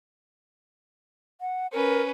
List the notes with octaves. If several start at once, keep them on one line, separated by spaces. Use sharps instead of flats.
F#5
C#4 A#4 B4